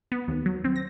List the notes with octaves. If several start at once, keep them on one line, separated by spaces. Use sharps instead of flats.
B3
D#2
F#3
C4
A#6